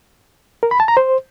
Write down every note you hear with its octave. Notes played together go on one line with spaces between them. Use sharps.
A#4
B5
A5
A#5
C5